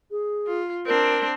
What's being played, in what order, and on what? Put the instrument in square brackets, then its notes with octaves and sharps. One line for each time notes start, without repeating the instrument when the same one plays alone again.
[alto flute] G#4
[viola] F4
[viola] C4 D4 [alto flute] A#4